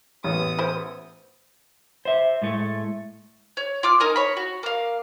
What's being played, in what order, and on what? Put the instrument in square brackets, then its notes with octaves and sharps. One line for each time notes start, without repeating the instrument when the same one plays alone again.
[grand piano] A1 [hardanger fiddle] B3 D#6
[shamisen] E4 C5
[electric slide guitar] C5 E5
A2 G#3 A3
[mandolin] C#5
F4 D6 F6
D#4 A#4 G#5
C#5 B5
F#4
A#3 F5